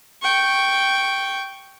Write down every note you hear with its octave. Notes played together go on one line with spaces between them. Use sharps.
G5 C#6